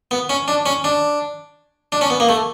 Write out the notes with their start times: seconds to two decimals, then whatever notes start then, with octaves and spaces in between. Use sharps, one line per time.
0.11 B3
0.30 C#4
0.48 D4
0.66 C#4
0.84 D4
1.92 D4
2.01 C#4
2.10 B3
2.20 A#3
2.29 A3